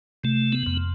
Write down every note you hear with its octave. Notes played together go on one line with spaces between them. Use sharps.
C3 A3
B3
F2